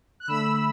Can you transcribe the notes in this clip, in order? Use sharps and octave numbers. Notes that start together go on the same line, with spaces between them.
F#6
D3 A3 B5 E6